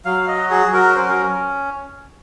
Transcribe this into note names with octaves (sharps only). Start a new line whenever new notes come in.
F#3 F5
D#5
F#4
G#4
F#3
A#4
C#4 C5
A#4